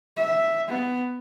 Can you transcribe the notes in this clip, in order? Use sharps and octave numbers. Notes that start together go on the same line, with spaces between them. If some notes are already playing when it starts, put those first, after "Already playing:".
E5
B3